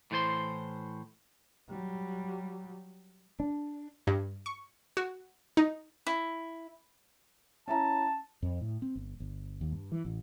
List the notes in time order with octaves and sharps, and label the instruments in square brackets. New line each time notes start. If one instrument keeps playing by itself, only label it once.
[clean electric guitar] A2 E3 C5 G#5 C6
[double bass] F#3 G3
[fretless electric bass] D4
[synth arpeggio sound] G2
C#6
F#4
D#4
[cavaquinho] E4
[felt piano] C#4 E4 A#5 [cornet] A5
[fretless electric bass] F2
A2
C4
G1
G1
D#2
G2
E3
A1